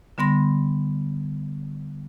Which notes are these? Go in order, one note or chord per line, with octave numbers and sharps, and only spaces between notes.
D3 G3 B3 C6 A#6